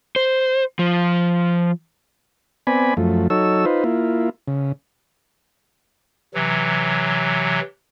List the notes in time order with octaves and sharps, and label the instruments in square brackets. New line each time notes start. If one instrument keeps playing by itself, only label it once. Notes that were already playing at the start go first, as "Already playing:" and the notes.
[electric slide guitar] C5
F3
[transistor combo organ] B3 C4 D5 G#5 B5
F#2 F3 A3
F#3 D#4 A4 C#5 E6
D#4 F4 B4 C5
A#3 E4 F4
C#3
[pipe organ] C3 E3 F#3